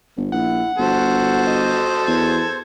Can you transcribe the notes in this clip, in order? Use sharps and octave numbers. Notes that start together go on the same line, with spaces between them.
G1
A#1 E4 F#5
G1 F#4 A4 C5
D#5
E2 G#6